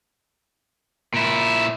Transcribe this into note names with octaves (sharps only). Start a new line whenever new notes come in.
A#2 E4